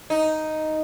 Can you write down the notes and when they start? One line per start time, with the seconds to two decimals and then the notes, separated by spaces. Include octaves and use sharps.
0.10 D#4